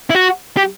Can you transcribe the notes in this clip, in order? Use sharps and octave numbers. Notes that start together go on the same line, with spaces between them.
E4
F#4
G4